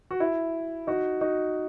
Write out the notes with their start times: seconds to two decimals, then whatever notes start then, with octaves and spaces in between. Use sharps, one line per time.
0.11 F#4
0.20 E4
0.87 D#4 F#4
1.21 D#4 F#4